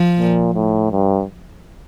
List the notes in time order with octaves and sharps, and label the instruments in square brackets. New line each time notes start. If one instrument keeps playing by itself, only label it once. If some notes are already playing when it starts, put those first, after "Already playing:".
Already playing: [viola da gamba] F3
[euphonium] A#2
A2
G2